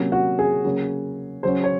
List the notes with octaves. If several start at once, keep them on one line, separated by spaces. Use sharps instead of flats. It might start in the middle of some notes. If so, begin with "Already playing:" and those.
Already playing: C3 F#3 A#3 C#4
F#4
G#4
C#3 F#3 A#3 C#4
C#3 F#3 C#4 C5
C#5